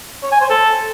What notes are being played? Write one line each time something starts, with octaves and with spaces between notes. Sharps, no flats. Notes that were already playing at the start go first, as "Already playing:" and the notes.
C#5
G#5
C5
A4